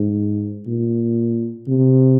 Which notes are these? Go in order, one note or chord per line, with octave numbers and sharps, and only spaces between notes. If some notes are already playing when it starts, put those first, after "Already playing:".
Already playing: G#2
A#2
C3